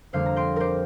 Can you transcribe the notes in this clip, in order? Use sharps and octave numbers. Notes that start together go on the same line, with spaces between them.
F2 D3 G3 A#3 C5 F5
A#5
G5 C6
G4 A#4 C5